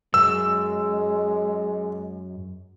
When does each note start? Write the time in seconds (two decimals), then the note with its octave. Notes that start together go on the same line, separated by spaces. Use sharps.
0.14 F#2 G#3 E6